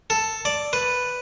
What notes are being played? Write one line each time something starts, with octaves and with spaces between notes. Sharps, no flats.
A4
D5
B4